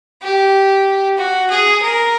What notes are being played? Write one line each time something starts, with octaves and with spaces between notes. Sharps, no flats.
G4
F#4
G#4
A#4